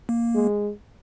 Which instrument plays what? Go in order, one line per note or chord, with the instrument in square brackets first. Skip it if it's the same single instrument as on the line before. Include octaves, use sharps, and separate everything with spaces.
[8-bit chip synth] A#3
[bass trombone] G#3